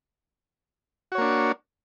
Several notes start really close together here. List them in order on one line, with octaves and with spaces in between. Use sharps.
F#4 C#5 A#3 D4